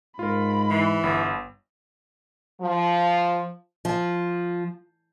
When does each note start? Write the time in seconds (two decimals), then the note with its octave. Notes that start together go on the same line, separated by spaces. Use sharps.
0.19 G#2 F4 A#4 B5
0.70 E3
1.03 G1
2.61 F3
3.85 F3